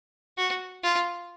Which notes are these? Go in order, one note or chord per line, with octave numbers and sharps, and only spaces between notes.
F#4
F4